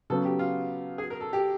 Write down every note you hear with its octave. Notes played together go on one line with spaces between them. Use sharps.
C#3 F#3 B3 A4
G4
F4
G#4
A#4
A4
G4